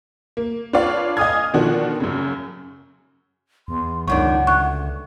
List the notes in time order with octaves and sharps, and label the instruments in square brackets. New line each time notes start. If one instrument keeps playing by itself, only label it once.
[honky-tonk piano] A#3
D4 F4 B4 C#5 D5 F5
D#5 F5 G#5 D#6 F6 G#6
B2 D3 D#3 F3 D4 F#4
F#2 C#3
[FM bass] E2 [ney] C6
[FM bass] C#2 [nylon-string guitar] F#2 D#3 D4 [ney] F#5 [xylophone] C#6
[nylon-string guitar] D2 [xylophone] C#6 F#6